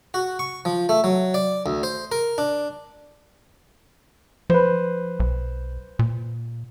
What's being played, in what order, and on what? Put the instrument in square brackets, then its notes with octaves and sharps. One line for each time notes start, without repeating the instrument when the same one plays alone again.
[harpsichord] F#4
C#6
F3
A3
F#3
D5
D2
C5
A#4
D4
[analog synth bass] F3 [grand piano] B4 C5
[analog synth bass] B1
A#2